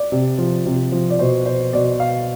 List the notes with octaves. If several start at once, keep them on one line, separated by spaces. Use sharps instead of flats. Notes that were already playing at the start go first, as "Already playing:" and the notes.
Already playing: D5
C3
F3
C3
F3
D5
B2 C5
C5
B2 D5
F5